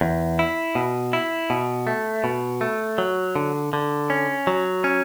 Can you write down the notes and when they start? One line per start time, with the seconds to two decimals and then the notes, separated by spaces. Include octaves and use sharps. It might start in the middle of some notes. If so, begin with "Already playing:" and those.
0.01 E2
0.39 E4
0.75 B2
1.13 E4
1.50 B2
1.87 A3
2.24 B2
2.61 A3
2.98 F#3
3.36 D3
3.73 D3
4.10 C#4
4.47 F#3
4.84 C#4